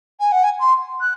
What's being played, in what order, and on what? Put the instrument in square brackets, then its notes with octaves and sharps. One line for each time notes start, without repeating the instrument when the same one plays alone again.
[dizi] G#5
F#5
G#5
C6
F#6